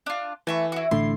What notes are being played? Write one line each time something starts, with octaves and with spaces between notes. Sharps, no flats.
D4 F4
E3 A3 E5 C#6
E4 F#4
A1 A2 D3 E4 C6